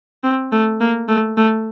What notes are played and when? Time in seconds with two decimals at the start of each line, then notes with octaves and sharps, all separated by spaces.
0.24 C4
0.52 A3
0.81 A#3
1.09 A3
1.37 A3